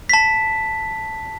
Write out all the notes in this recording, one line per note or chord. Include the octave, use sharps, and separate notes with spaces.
A5 B6